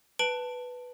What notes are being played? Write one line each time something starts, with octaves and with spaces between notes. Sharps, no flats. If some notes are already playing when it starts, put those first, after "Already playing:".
B4 A5 D7 F#7